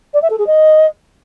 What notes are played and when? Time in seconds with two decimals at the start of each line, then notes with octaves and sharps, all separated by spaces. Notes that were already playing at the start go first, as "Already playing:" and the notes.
0.14 D5
0.22 E5
0.30 A4
0.38 G#4
0.47 D#5